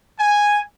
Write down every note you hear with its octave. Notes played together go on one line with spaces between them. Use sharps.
G#5